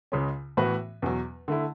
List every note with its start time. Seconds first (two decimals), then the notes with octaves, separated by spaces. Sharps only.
0.12 C#2 C#3 G#3 C#4
0.57 A2 E3 B3 F#4 B4
1.02 E2 B2 F#3
1.48 D3 A3 E4